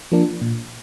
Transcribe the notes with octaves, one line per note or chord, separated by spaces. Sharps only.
F3 A#3 D4
A#2